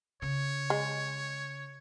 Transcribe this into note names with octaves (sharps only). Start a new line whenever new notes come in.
C#3 C#5
G#3